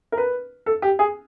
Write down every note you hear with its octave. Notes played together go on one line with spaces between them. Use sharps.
A#4
B4
A4
G4
G#4